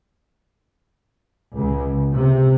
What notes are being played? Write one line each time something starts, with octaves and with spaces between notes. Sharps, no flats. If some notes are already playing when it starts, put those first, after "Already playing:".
C#2
C3